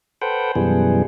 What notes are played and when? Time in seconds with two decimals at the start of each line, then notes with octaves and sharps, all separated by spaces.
0.22 A4 B4 C5 F#5 G5
0.55 F#2 B2 E3 G3 G#4